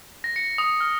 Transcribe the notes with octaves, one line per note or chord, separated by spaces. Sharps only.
A#6
C#7
D#6
F6